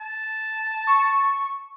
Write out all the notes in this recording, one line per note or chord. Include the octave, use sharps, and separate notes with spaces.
A5
C#6